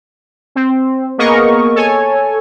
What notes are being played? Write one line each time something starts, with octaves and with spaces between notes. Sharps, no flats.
C4
A#3 B3 G#4 A#4 D#5 C#6
A4 C#5 G#5